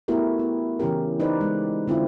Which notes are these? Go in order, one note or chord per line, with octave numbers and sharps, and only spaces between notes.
A3 B3 E4 F#4 G4 A#4
B3
C#3 E3 C#4 G4 A#4
D#4 B4 C5 D5
G#3
D3 C4 E4 F4